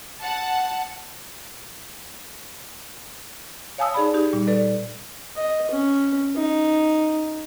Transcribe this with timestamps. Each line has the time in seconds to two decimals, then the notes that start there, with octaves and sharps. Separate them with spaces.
0.21 F#5 A5
3.78 C#5 F5 G#5 A5 D#6 E6
3.94 D#4 G#4 D5 B5
4.14 D#4 G4
4.33 A#2 G3
4.47 A4 B4 D5
5.36 D#5
5.71 C#4
6.35 D#4